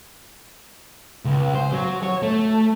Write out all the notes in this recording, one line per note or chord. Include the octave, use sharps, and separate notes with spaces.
C#2
C5
F#3
C#5
A3